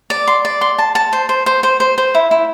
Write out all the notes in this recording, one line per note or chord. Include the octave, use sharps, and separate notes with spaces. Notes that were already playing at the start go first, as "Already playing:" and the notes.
D5
C6
D5
C6
A5
A5
C5
C5
C5
C5
C5
C5
E4
E4